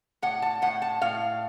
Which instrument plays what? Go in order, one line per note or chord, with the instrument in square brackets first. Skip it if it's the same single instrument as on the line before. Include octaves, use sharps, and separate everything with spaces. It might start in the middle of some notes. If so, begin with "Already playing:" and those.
[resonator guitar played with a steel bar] A2 F#5
A5
A2 F#5
A5
A2 F5